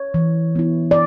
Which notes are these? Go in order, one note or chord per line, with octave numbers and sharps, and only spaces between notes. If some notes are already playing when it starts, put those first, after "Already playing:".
Already playing: C#5
E3
B3 E4
D5